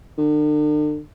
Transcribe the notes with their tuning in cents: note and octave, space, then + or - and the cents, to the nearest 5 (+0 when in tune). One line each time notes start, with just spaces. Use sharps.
D3 +40